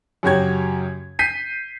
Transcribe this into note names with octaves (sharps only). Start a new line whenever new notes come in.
F#2 C#3 F#4 G4 C#5 G#6
G6 B6 C7 D#7